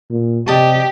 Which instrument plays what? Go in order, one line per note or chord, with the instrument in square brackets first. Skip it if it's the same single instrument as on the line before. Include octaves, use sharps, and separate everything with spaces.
[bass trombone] A#2
[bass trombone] C3 [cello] G4 [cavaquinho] D5 D#5 A5